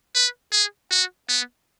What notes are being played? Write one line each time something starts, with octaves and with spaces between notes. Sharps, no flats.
B4
G#4
F#4
B3